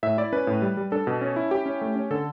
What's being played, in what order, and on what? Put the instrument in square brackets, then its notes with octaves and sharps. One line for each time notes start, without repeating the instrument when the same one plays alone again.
[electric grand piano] A2 E5
E4 D5
C#4 B4
A2
G3
G3
D4 A4
B2
C#4
E4
E4 G4
C#4
A3
C#4
D3 A4